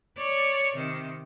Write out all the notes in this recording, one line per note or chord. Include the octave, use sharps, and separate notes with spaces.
C#5 D5
C3 D#3